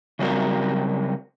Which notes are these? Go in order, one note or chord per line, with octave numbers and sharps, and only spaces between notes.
C#3 F#3 G3 C4 F#4 A#4